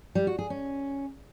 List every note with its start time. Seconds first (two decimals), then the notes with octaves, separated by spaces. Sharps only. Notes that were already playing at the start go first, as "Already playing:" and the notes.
0.15 G3
0.27 F#4
0.39 G#4
0.50 C#4